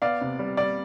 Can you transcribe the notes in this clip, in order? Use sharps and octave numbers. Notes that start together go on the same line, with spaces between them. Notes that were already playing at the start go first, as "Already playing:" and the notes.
B3 D5 F5
C3
G3
G3 D5